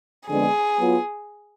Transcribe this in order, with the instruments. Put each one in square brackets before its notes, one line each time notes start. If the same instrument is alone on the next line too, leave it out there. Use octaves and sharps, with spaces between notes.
[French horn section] F2 D3 G#3 B3 D4 [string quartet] G#4
[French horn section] F#3 B3 F4